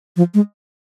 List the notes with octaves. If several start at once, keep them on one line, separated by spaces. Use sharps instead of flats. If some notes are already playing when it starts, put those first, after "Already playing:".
F3
G#3